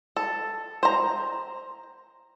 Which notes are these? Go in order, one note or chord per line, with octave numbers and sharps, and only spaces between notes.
A4
C5 A#5